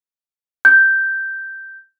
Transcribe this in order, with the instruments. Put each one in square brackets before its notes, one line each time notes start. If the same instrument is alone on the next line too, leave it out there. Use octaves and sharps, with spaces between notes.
[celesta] G6